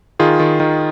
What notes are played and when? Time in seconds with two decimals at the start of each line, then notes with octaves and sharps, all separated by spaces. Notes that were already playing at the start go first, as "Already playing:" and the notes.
0.19 D#3 F4 G#4
0.40 D#3
0.60 D#3